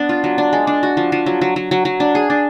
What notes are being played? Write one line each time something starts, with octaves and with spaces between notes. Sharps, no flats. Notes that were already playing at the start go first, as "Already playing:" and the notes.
Already playing: B3 D4
F4
F#3
D4
G#3
D4
F#4
F3
F3
F#3
F#3
F#3
F#3
F#3
D4
G#4
D4